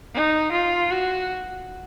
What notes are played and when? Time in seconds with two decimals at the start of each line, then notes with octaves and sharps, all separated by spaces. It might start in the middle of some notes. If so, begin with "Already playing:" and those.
0.14 D#4
0.52 F4
0.91 F#4